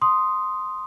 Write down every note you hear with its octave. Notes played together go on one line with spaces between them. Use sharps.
C6 D#6